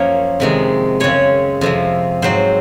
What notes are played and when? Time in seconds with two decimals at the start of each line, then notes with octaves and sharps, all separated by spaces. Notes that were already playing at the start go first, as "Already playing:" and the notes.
Already playing: F#2 F3 A#3 C#5
0.40 F2 C3 D#3 G#3
1.00 F#2 C#3 G#3 C4 C#5
1.61 F2 C3 F3
2.22 G#2 F#3 C4 C5